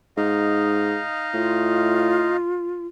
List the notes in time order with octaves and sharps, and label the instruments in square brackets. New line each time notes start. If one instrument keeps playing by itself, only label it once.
[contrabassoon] G#2 [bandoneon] D#4 D#5 F5
[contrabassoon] A2 [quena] F4